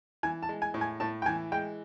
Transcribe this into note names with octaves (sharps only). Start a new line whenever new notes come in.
E3 G#5
A5
G#3
G#5
A2
G#5
A2 A5
G5
E3 G#5
G#3 G5